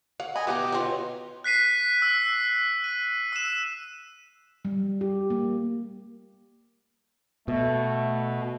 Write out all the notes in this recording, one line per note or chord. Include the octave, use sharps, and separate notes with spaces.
C#5 F5 F#5
D#5 G#5 B5
B2 E3 B3 G4 D#5 A#5
C4 D#4 F4 C#5
F#6 B6 C7 D#7
E6
D#7
E6 E7
G3
G4
A#3
B2 A3